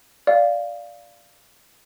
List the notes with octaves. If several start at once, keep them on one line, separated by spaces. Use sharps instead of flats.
D5 F5